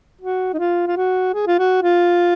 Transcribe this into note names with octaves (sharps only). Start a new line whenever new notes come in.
F#4
D#4
F4
F4
F#4
G#4
F4
F#4
F4